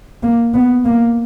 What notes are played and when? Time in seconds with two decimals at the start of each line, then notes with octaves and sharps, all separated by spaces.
0.23 A#3
0.54 B3
0.85 A#3